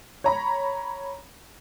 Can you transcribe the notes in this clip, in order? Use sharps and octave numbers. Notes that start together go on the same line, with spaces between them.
C#5 A#5 B5